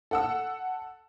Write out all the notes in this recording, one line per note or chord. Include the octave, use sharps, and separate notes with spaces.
A4 F#5 E6